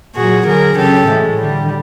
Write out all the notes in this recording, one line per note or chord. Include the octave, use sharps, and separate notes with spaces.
A#2 F#3 F#4 G#4
D3 F#3 G#4 A#4
C#3 F#3 G4 A4
A2 E3 G#3
D3 G3